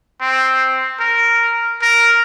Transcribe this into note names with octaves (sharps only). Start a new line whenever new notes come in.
C4
A#4
A#4